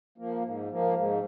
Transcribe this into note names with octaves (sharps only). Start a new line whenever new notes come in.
F3 A#3
G#2
F3 A#3
G#2